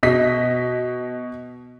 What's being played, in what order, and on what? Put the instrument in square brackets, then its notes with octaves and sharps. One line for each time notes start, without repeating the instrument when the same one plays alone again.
[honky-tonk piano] B2 D#5 B6